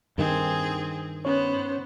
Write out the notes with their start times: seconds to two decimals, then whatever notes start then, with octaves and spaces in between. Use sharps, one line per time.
0.18 G2 D#3 C4 G#4
1.25 B3 C#4 C5 C#5